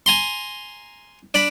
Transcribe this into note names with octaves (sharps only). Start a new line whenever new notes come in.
G#5 A#5 C6
D4 D5 B5